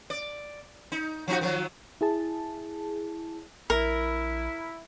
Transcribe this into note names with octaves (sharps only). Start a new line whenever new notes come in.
D5
D#4
F3 D#4 F#4
D#3 F3 F#3
E4 G#4 A5
A#1 E4 A#4